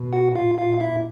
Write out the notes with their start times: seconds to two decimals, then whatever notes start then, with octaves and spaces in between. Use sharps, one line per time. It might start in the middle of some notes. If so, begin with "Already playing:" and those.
Already playing: B2
0.13 F#4 F#5
0.35 A#2 F4 F5
0.58 F4 F5
0.66 A#2
0.75 F5
0.80 E4 E5